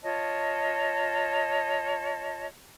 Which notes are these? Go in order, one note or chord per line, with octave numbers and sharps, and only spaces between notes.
F4 C#5 D#5 A5